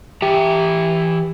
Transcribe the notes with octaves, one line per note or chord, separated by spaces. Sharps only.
E3 G4 E5 A#5